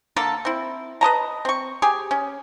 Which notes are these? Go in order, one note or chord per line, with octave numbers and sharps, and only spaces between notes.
D3 A#3 A4 A5
C4 E4
B4 D#5 A5 A#5
C4 C#6
G4 G#4 G#5
C#4